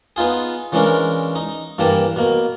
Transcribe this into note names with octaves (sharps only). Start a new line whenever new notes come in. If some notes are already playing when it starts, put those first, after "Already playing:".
B3 D#4 F4 G#4
C#3 E3 G#3 C#4 D4 A#4
D#4
G2 E3 A#3 G4 A5 A#5
B2 A#3